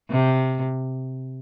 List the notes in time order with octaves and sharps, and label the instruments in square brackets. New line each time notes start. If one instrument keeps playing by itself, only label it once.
[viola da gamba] C3